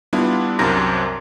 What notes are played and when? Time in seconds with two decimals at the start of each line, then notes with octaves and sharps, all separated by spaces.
0.13 G3 B3 D4 E4 F4
0.59 C2 F#2 C3 D4 A#5 A#6